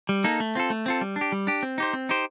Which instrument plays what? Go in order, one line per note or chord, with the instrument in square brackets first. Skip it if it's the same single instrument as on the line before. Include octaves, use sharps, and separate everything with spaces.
[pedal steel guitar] G3
A#3 D#4 A4
A3
C4 F4 A4
A3
C4 F4 A4
G3
D4
G4
G3
D4 G4
C4
D#4 G4 C5
C4
D#4 G4 C5